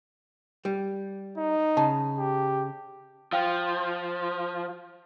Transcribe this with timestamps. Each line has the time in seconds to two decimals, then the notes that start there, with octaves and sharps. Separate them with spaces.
0.65 G3
1.37 D#4
1.77 C#3 A5
2.19 G4
3.32 F3 F5 G5 F6